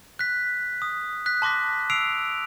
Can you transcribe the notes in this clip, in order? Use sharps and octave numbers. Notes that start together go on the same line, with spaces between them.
F#6 B6
D#6
F#6 B6
A5 C6 D6 A#6 B6
E6 C7 D7 F7